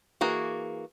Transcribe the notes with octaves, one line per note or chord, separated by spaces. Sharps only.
E3 A#3 F#4 G#4